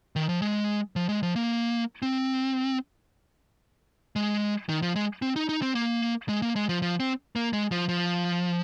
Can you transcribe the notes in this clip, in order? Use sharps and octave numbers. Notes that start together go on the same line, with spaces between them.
D#3
F3
G#3
F3
G#3
F3
A#3
C4
G#3
D#3
F3
G#3
C4
D#4
D#4
C4
A#3
G#3
A#3
G#3
F3
F3
C4
A#3
G#3
F3
F3